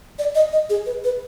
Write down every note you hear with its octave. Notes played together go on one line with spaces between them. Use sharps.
D5
D#5
D#5
G#4
B4
B4